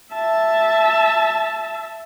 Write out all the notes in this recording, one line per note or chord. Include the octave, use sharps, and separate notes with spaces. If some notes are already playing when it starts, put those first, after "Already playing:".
E5 A5